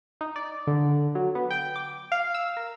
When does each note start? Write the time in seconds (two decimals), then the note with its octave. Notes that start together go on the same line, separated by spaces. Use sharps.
0.21 D#4
0.36 D5
0.67 D3
1.15 F#3
1.35 B3
1.51 G5
1.76 D6
2.12 F5
2.34 E6
2.57 A#4